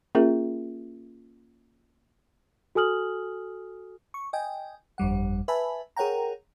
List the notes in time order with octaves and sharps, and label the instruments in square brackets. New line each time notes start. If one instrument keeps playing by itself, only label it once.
[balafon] A#3 C#4 F4 G#4 A#4 E5
[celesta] F#4 A4 G#5 D#6 F6 F#7
[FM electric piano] C#6
D#5 G5 G#5
G1 F2 G3 F#5
B4 E5 G#5 A5 B5
G#4 A#4 C#5 F#5 G5 A#5